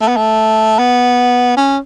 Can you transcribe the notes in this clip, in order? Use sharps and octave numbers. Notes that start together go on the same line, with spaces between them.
A3
B3
A3
B3
C#4